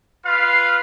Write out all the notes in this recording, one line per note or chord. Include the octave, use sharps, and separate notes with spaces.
F4 B4 F5